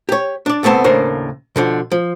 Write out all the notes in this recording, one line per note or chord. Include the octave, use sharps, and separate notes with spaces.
G4 C#5
D4 D5
C2 A3 B3 C4 A5
D#2 A2 C#3 D4 A#4 C5
B2 D3 F3
F3